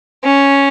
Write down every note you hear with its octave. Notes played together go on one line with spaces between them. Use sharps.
C#4